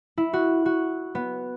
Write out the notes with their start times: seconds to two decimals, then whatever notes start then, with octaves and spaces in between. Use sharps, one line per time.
0.18 E4
0.33 F#4
0.66 F#4
1.15 B3